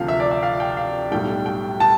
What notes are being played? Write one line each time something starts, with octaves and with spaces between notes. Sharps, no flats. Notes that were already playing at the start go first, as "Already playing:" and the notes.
Already playing: D2 C3 F3 F5
E5
D5
E5
F5
G5
F5
B1 A2 G3 G5
G5
A5